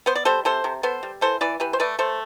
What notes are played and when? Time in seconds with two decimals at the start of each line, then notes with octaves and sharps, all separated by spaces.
0.06 B3 C5
0.15 D5
0.25 G3 A4 C5
0.45 C3 A4 C5
0.64 C3
0.83 B3 A4 C5
1.03 G3
1.21 E3 A4 C5
1.41 E3 B4 D5
1.60 E3 G4 B4
1.73 C5
1.80 A3 B4 D5
1.99 A3 A4 C5